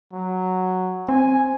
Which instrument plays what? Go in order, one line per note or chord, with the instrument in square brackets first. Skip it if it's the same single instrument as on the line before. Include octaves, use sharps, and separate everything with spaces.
[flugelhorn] F#3
[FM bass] C4 [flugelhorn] G#5